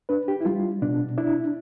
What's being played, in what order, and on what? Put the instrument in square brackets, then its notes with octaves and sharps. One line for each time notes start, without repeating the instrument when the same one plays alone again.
[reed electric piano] D4 B4
G4
E4
G3 F4
B2 D4
D4 E4